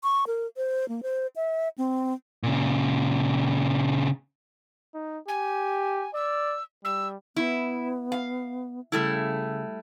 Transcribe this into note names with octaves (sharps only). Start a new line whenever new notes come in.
C#6
A#4
C5
A#3
C5
E5
C4
A#2 C#3
D#4
G4 G#5
D5 E6
G3 E6
B3 E4
F5
C#3 G3 A3 E4